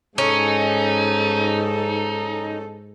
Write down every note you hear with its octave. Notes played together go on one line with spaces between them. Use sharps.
G#2 C#4 D#4 A4